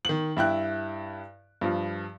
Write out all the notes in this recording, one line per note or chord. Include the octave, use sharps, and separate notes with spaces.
D#3 F#7
G2 E4 G5 F#6
G2 F3